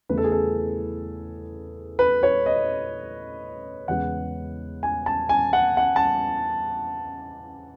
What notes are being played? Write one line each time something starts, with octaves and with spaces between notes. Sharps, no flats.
E2 C#3 E3 A3 B4
A4
G#4
A4
B4
C#5
D#5
E2 C#3 G#3 B3 F#5
G#5
A5
G#5
F#5
F#5
A5